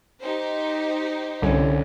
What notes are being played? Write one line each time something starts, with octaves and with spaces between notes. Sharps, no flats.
D#4 G4 C5
C2 D3 C#4